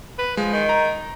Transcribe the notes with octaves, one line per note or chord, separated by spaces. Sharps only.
B4
F3 G#3
D#3
A#5